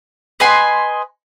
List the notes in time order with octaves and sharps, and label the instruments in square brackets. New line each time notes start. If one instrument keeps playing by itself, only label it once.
[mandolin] B4 D#5 G#5 C6